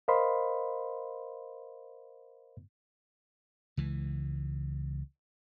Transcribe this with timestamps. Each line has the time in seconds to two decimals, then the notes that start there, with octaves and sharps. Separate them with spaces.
0.08 A#4 C5 D#5 F5 B5 C6
3.77 C#2 E3